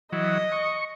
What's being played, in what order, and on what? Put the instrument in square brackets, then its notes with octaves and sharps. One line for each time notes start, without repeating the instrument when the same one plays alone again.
[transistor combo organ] E3 F#3 [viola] D#5
[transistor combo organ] C#6